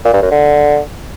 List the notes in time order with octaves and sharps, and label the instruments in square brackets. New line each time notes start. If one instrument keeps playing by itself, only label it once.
[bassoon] A#2
G2
F#2
D3